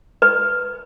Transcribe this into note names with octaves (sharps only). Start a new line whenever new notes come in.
B4